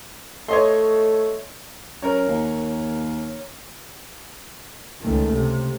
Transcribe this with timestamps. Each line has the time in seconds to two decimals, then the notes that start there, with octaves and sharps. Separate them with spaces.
0.48 A3 C#5 D#5 C6
2.02 F#2 A#4 C#5
2.28 D#2
4.99 C#2 D#3 A3
5.34 C3